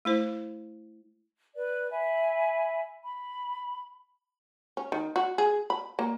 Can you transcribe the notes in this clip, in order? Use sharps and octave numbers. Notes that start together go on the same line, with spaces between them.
A3 E4 C5
B4 D5
E5 G#5 B5
B5
C#4
D#3
F#4
G#4
B5
A#3